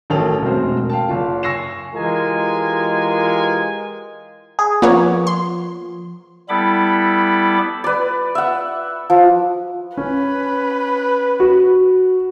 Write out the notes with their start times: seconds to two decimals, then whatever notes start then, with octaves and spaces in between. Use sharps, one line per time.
0.10 A1 D#3 F#3 C#4 A4 F7
0.42 E1 F2 A3 F#4 C5
0.89 F5 G5 A5
1.09 F#1 F4
1.43 G#5 C#6 E6 A#6 C7 E7
1.95 E3 G#3 F4 G4 A#4 G#5
4.59 G#4
4.82 F3 A#3 B3 C#5
5.27 C6
6.49 G3 B3 E4 A4 B5 D6
7.84 B4 D5
8.35 E5 F#5
9.10 F3
9.97 C#4 B4
11.40 F#4